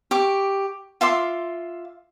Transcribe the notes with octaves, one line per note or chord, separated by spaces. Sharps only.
G4 C#6 D6
F4 E5 C6 D6